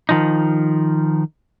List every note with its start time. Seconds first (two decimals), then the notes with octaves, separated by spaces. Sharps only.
0.09 D#3 F3 D#4